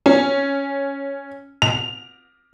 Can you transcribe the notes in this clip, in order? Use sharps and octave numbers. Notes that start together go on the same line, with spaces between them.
C#4
F7